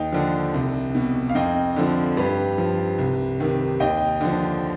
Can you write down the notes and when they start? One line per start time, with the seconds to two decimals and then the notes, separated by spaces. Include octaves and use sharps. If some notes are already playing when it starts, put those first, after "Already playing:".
Already playing: D#2 D#5 G5
0.12 D3 F3
0.54 C2
0.95 B2
1.29 F5
1.35 F2 D#5 G5
1.76 D3 F3
2.17 G2 G4 B4
2.58 F3
2.98 C2
3.40 C3 D#3
3.80 D#2 D#5 G5
4.21 D3 F3